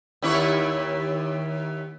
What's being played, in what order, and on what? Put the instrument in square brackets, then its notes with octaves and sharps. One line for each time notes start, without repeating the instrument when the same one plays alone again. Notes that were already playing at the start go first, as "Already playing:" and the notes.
[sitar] D#2 E4 C#5